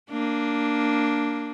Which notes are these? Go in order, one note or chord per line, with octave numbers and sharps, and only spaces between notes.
A#3 D4